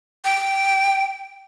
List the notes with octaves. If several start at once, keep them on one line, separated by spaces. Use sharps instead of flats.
G5